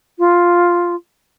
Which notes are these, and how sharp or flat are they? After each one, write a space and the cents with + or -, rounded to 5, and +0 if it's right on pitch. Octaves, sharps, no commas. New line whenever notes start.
F4 +0